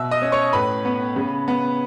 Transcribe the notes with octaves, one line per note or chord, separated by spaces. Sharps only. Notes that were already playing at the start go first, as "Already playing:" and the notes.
Already playing: B2 E5 E6
D#5 D#6
C#4
C#5 C#6
A2 B4 B5
B3
C#3
B3